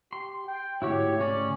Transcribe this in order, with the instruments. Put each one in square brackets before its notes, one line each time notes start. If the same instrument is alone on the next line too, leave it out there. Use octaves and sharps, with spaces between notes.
[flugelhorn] G4 [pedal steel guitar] C6
[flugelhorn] G5
[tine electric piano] G#2 D3 A3 [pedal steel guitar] E4 F#4 G4 [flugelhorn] C#5
[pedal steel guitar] C#3 C#4 D5